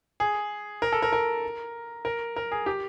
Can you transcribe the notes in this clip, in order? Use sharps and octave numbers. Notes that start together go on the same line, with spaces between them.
G#4
A#4
A4
A#4
A#4
A#4
A#4
G#4
G4